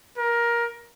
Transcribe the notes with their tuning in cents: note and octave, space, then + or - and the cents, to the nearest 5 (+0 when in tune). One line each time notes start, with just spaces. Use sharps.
A#4 +15